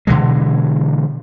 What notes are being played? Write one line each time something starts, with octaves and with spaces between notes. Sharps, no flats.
B2 D3 E3 G#3